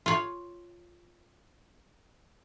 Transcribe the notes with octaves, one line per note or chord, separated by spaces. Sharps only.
F4 C#5